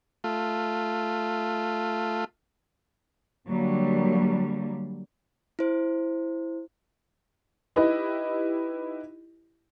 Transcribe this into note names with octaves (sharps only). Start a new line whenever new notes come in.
A3 F4
D3 F#3 G3 A#3
E4 C5
D#4 E4 G4 B4 D#5